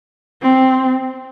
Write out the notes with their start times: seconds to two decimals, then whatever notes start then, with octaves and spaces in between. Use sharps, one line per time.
0.42 C4